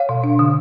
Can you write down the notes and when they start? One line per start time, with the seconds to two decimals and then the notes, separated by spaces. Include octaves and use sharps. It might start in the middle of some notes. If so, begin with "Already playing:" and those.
Already playing: C#5 F5
0.09 B2
0.24 D4
0.39 D3